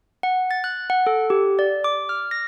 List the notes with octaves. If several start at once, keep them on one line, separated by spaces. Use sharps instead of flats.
F#5
A6
F#6
F#5
A4
G4
D5
D6
F6
A#6